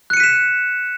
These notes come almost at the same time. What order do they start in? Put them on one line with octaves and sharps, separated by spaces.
F#6 C#7 D#7 B6 E7